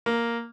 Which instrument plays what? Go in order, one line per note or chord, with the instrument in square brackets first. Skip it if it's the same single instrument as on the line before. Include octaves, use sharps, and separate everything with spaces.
[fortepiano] A#3